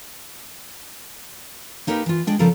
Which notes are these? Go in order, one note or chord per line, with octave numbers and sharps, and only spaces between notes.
A#3 D#4 G4 A#4 B4
E3 F4
G#3 D4 G5
C#3 F3 B3 A4 A#4